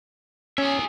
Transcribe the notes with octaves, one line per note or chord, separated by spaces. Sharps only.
C#4 G#4 E5